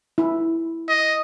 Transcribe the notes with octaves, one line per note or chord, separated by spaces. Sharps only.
E4
D#5